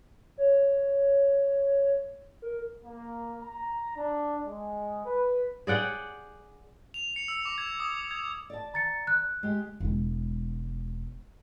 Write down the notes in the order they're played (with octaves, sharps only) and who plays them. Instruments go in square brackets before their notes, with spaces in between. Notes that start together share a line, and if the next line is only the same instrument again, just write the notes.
[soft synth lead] C#5
A#4
[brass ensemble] A#3
A#5
D4
G#3
B4
[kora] G#4 D5 F#5 G5
[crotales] F7
C#7
E6
D6
G#6
D#6
G#6
[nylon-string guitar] D5 A5
[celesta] A#5 A6 C#7
F#6
[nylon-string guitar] G#3 G4
[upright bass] E1 G#3